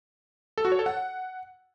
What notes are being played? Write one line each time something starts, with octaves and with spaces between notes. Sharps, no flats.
A4
F#4
C#5
A4
F#5